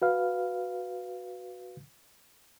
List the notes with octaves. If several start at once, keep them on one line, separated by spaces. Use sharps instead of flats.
F#4 B4 F5